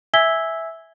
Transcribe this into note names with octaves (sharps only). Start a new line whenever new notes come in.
E5 G#5 E6 G#6 B6 G7